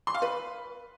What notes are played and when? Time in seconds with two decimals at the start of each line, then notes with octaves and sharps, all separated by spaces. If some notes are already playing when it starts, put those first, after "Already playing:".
0.07 C6
0.15 F5
0.22 B4